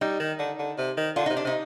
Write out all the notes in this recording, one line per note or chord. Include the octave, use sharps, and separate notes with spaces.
G3 D#4
D#3
D3
D3
C3
D#3
D3 F4
C3 D#4
D4
C3 D#4